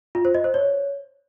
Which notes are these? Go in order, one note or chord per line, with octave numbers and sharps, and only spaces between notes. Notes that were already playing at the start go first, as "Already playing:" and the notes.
F4
C5
D#5
C5
C#5